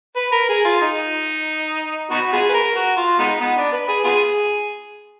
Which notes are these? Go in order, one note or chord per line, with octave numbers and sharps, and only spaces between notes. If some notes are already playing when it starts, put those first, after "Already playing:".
B4
A#4
G#4
F4
D#4
B3 D#4 F#4
B3 F4 G#4
B4
A#4
F#4
F4
G#3 B3 D#4
B3
D4
B4
G#4
B3 F4 G#4